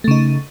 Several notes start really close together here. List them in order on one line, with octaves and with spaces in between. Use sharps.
A3 C#3 D#4